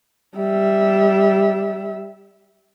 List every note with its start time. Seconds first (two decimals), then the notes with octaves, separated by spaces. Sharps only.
0.37 G3 E5